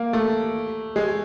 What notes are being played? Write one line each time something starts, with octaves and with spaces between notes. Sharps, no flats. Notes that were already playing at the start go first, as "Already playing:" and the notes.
Already playing: A#3
A3
G#3